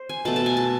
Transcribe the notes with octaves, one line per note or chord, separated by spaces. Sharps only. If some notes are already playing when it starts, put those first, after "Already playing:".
Already playing: C5
G#5
B2 A3 A5
A5
G#5
A5